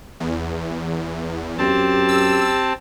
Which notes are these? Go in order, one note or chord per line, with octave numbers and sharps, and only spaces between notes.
E2
F#2 C4 G4 A5
E6